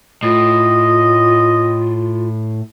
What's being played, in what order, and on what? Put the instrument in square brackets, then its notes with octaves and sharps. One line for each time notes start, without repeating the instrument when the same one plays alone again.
[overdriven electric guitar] A2 [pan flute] F4 [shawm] D#5